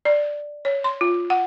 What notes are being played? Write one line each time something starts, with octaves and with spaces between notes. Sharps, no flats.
D5
C#5
C6
F4
F#5